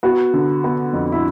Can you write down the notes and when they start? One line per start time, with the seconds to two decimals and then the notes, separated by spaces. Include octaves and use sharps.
0.03 B3 F#4
0.34 D3
0.64 B3
0.93 F2
1.12 E4